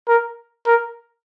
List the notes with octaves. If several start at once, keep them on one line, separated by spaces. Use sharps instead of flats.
A#4
A#4